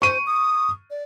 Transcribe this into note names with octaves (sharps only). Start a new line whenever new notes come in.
C5 C#6 D#7
D#6
D5